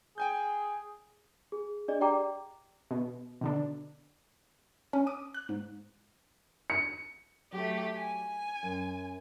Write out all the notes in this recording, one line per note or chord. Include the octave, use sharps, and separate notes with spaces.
G#4 G5 G#5 G6
G#4
D4 G#4 D5 D#5
G4 D5 G5 A#5 D6
B2
B2 D3 D4
C#4
D6 D#6
F#6
G#2
C#7
F#3 A3 G4
G#5
F#2